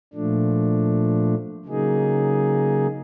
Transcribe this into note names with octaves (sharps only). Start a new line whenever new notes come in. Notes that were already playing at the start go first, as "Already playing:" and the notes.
A#2 F3 A3 D4
C#3 F#3 A#3 D#4 G#4